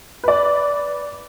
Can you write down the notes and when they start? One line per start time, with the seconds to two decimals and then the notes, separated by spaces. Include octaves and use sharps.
0.24 B4 D5